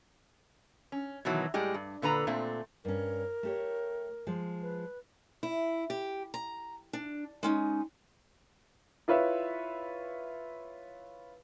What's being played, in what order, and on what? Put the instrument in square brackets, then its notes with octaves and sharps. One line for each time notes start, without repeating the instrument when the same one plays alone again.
[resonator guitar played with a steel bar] C#4
B2 D#3 E3 F#3
A2 G3 G#3 G4
G2
A#2 D3 B4 A#5
A#2 A3 C4
[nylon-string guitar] G2 C#4 [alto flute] A#4
[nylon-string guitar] A3 G4 C#5
F3 G#3
[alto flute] B4
[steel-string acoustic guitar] E4
G4
A#5
D4
G#3 C#4 D#4
[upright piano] E4 F4 B4 C#5 E5